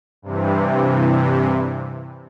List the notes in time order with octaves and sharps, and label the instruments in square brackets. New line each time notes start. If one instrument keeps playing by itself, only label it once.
[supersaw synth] G2 C3 E3